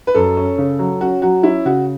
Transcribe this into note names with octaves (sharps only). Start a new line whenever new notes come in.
B4
F#2 A4
C#4
C#3
F#3
C#4 F#4
F#3 F#4
C#4 E4
C#3 F#4